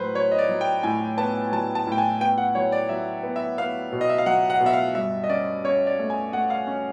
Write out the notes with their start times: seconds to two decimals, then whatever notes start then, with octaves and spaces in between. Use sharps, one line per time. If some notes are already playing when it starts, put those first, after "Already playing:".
Already playing: A2 F#3 B4 C5
0.15 F#3 C#5
0.32 D#5
0.38 D5
0.49 F#3
0.61 G5
0.83 A2 G#5
1.17 B3 A5
1.52 F#3 A5
1.75 A5
1.87 A2
1.92 G5
1.98 G#5
2.20 B3 G5
2.38 F#5
2.55 F#3 C#5
2.72 D5
2.89 F#3 E5
3.23 B3
3.36 E5
3.58 B3 F5
3.92 B2
4.01 D#5
4.09 E5
4.18 F5
4.26 F#3 F#5
4.50 F#5
4.61 B2
4.66 E5
4.73 F5
4.95 G2 E5
5.24 D#5
5.29 C#4 D5
5.63 C#4 C#5
5.87 D5
5.99 A3
6.10 G#5
6.32 A3 F#5
6.50 F5
6.67 C#4